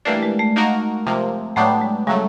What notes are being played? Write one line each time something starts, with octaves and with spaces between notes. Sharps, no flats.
E3 G3 A3 A#3 D4
G#3
A3
A#3 D#4 F#4 A#4
C3 F3 A#3
A2 F#3 A3 B3 D4 G4
G#3
C#3 F#3 G3 A3